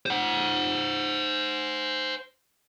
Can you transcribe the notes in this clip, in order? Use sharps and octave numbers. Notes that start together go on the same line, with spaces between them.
C5 F#5